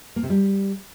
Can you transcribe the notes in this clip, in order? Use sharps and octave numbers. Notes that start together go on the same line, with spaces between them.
A#3
C3
G3